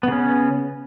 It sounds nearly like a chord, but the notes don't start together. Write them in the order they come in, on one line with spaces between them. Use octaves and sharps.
B3 C#3 C#4